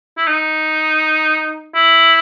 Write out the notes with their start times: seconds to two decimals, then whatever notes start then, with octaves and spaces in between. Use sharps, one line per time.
0.17 E4
0.27 D#4
1.75 E4